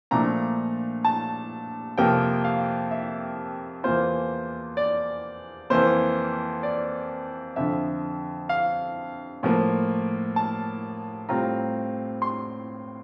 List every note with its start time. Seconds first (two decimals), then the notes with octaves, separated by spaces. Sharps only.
0.11 A#2 F3 A3 D4 A#5
1.05 A5
1.98 F2 C3 F3 A#3 G5
2.44 F5
2.91 E5
3.84 E2 E3 A#3 F4 C5
4.77 D5
5.70 F2 E3 A#3 C5
6.63 D5
7.56 F2 D3 F3 E5
8.49 F5
9.43 A2 F3 A#3
10.36 A5
11.29 A2 G3 C4 F4 A#5
12.22 C6